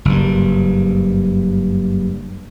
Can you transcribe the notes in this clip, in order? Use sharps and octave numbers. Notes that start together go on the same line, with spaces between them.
F#1 G2